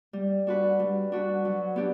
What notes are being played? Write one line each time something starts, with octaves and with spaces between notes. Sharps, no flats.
G3
D4 F#4 B4
G3
D4 F#4 B4
F#3
B3 D4 G4